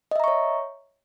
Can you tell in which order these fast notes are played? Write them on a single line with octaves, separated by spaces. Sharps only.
D#5 E5 A#5 C#6 C#5